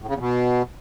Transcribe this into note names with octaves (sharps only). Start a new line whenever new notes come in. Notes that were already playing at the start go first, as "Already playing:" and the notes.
A2
C#3
E2
B2